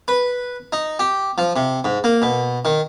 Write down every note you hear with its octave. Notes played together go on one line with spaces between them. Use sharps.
B4
D#4
G4
F3
C3
G#2
A#3
B2
D#3